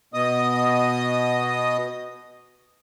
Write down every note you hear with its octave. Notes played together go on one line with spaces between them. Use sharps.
B2 B3 D#5 D#6